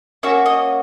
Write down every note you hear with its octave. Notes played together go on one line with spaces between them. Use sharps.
A#3 C#4 F#4 E5
D#5